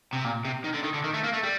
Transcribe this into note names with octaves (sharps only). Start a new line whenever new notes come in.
C3
A#2
C3
D#3
D3
D#3
D3
D#3
A3
A#3
A3
G3